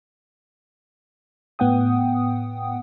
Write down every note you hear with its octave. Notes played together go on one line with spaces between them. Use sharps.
A2 B3 F#5 G5 D#6